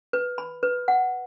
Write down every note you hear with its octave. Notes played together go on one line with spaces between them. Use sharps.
B4
B5
B4
F#5